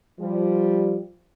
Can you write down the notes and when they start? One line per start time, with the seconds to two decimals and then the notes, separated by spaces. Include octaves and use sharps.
0.19 F3 G3